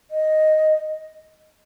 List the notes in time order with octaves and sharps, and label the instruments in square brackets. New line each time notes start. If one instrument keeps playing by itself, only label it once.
[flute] D#5